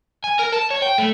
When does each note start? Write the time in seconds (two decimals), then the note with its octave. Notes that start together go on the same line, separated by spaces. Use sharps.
0.24 G#5
0.39 A#4
0.52 A5
0.70 C#5
0.82 G5
0.98 A3